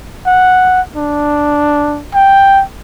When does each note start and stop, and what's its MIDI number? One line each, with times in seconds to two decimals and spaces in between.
0.27 0.81 78
0.96 2.04 62
2.14 2.63 79